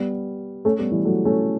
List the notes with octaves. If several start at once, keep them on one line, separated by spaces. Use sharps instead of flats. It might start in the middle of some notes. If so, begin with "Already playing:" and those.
Already playing: G3 B3
A3 C#4
G3 B3
E3 G3
F#3 A3
A3 C#4